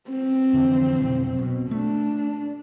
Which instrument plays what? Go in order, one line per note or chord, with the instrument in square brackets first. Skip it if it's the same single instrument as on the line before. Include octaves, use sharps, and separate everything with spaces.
[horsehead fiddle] C4
[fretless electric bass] F2 D3 E3
F1 B1
B2
[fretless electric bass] A3 [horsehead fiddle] D4